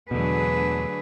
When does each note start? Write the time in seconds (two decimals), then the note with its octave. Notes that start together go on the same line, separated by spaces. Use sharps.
0.11 E2 B2 D3 F#3 A3 G#4 B4